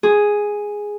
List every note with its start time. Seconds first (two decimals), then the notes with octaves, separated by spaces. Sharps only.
0.03 G#4